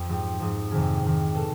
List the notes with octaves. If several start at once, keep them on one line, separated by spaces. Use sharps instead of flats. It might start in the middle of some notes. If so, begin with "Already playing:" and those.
Already playing: F2
G#2 F3 G4
G#2 F3
F2 C3 D#3 G#4
F2 C3 D#3
B2 A4